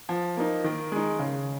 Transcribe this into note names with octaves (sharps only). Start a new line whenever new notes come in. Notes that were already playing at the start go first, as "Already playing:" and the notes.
F3
A#3 D#4
D#3
G#3 D#4
C#3